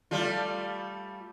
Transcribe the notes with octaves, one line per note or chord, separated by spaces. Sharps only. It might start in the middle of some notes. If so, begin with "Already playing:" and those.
G3 A3 F4